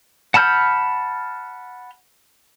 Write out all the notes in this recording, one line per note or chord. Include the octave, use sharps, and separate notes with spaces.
F#5 A5 B5 F6 G6